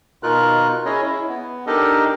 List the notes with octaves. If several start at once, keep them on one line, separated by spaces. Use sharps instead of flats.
B2 D#4 F4 A#4 F#6
C#4 E4 G#4 C#5 D#5
E4
B3
D4 D#4 G4 A4 A#4 D#5